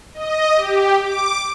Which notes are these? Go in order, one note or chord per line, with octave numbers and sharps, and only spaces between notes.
D#5
G4
D6